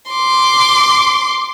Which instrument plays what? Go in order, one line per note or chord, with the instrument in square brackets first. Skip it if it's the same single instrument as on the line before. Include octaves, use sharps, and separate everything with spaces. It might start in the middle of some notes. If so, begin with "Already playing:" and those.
[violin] C6 D6